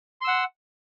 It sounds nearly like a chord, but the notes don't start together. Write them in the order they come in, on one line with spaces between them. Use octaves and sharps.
C6 E6 F#5